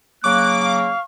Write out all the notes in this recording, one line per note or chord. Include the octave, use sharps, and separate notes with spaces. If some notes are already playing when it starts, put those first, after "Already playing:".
C#3 F#3 A#3 C#6 D6 F#6
F5